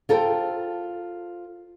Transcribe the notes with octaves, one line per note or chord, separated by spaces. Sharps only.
F4 A4 A#4 C5 G5